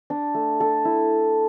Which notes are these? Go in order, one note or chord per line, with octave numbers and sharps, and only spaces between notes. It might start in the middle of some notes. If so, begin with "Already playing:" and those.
D4
A3
A4
E4